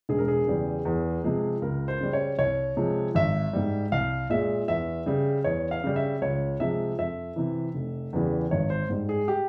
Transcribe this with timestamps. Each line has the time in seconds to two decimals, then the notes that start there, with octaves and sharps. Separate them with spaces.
0.09 E1 G#4
0.18 A#4
0.28 G#4
0.47 E2 C#3 G3
0.85 E2
1.24 C3 F3 G#3
1.62 C#2 A#4
1.88 C5
2.00 C#3 G3
2.13 C#5
2.38 C2 C#5
2.77 C3 F3 G#3
3.15 G#1 E5
3.53 G#2 G3
3.92 C2 F5
4.30 A#2 G#3 E5
4.68 E2 E5
5.06 C#3 G3
5.44 E2 C#5
5.71 F5
5.84 C#3 G3
5.96 E5
6.22 C#2 C#5
6.60 C3 F3 G#3 E5
6.98 F2 E5
7.36 C3 E3
7.75 F1
8.13 E2 C#3 E3 G3
8.51 G#1 C#5
8.70 C5
8.90 G#2 G3
9.09 G#4
9.28 G4